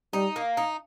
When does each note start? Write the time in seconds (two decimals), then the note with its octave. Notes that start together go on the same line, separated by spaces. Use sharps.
0.13 G3 D#4
0.36 A#3
0.57 D#4